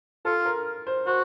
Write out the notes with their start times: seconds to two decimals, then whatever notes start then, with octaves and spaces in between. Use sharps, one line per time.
0.25 F4 A4
0.45 A#4
0.87 C5
1.07 F#4 C5